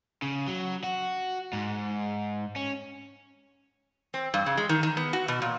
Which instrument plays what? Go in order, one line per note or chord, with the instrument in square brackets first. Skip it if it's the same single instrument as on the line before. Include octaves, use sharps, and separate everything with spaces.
[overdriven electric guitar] C#3
F#3
F#4
G#2
C#4
[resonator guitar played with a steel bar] C4
G2
C#3
G#3
D#3
D#3
B3
F#4
B2
A#2